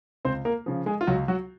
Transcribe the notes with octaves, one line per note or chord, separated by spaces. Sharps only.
C#2 C4 C5
A#3 A#4
C#3 F3
G#3 G#4
F4
C#2 F#3 F#4
F#3 F#4